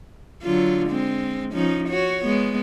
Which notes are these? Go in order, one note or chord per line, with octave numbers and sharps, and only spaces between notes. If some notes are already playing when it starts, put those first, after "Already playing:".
D3 F#3 F4
G#3 C4
F3 C#4 D#4
F#4 C#5
G#3 B3